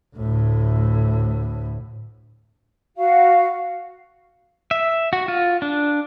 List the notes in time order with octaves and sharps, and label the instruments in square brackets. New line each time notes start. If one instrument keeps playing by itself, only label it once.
[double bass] D2 A2
[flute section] F#4 F5
[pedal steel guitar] E5
F#4
F4
D4